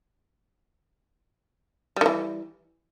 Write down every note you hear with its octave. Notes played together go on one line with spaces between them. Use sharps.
D#3 E3 G3